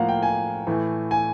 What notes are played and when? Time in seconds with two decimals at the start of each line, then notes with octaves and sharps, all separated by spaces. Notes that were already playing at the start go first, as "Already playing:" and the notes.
Already playing: A2 F3 A#3 F5 F#5
0.08 G5
0.23 G#5
0.67 A2 E3 A3
1.11 G#5